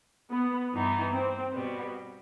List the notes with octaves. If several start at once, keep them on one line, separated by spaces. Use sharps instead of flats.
B3
G2 E3 B3 D#4
C4
B2 G3 B3